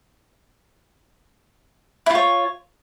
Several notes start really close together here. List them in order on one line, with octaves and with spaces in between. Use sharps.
E4 F4 C#5